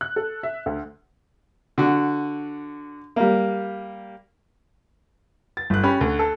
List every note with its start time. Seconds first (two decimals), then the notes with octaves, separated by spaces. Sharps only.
0.01 F#6
0.16 A4
0.43 E5
0.66 D2
1.78 D3 F#4
3.16 G3 A#3
5.57 A6
5.70 G1 F#6
5.84 C#4 G4 B5
6.01 D2
6.19 A4